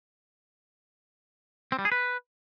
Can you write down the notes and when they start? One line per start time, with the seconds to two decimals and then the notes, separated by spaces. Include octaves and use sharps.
1.72 C4
1.79 G3
1.85 G#4
1.92 B4